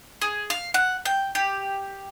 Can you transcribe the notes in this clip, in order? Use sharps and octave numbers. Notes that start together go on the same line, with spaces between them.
G#4
F5
F#5
G5
G4